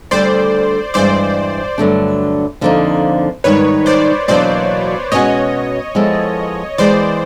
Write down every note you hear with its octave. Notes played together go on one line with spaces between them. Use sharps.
D2 D3 G3 C5 D5
G2 E3 G#3 C5 D5
G2 D3 F#3 A3 D4
F2 D3 F3 A#3 D#4
G#2 D#3 G3 B4 C#5
C5 D5
E2 B2 F#3 A#3 D4 C5 D5
B2 G#3 C#4 F#4 C#5 D#5
F3 G#3 B3 E4 A4
E3 G#3 B3 C5 D5